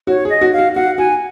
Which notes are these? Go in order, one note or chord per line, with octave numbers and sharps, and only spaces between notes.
F#4 C#5
G#4
D#5
F#4
F5
F#4
F#4 F#5
F#4 G#5